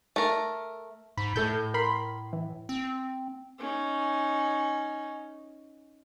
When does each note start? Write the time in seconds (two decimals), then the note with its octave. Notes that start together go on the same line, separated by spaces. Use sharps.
0.16 A3 A#4
1.17 G#2 B5
1.36 A2 A3 A4 G6
1.74 A#4 B5 C6
2.33 E3
2.69 C4
3.59 C#4 D#4